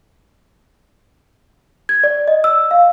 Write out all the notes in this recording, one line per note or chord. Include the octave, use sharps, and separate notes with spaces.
G#6
D5
D#5
E6
F5